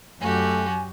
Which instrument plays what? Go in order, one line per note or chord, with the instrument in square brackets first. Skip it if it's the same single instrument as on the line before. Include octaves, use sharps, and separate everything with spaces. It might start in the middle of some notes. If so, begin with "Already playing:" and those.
[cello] F#2 [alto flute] A3 [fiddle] F#4 G4 [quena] G#5